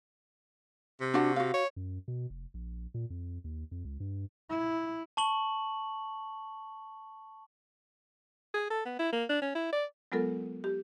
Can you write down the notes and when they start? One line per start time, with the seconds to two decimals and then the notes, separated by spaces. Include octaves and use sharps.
1.01 C3
1.14 D4 F#4 F#5
1.36 F#4 F5
1.54 C#5
1.76 F#2
2.08 B2
2.30 F1
2.54 A#1
2.94 A#2
3.10 F2
3.44 D#2
3.71 F2
3.85 C#2
4.00 G2
4.50 E4
5.17 A5 C#6 F#7
8.54 G#4
8.70 A4
8.85 B3
8.99 E4
9.13 A#3
9.29 D4
9.42 C#4
9.55 E4
9.73 D5
10.12 F#3 G#3 B3 F4 A4 A#4
10.64 G4